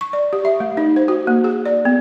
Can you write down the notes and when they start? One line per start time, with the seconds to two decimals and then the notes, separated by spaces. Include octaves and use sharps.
0.01 C#6
0.13 D5
0.33 G4
0.45 E5
0.60 A3
0.77 D#4
0.96 C5
1.08 F#4
1.27 A#3
1.44 G#4
1.65 D5
1.85 B3